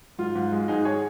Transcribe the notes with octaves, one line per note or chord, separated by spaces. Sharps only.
G#2 F4
G#2
G#3
G#2 D#4 G#4
G#4 C#5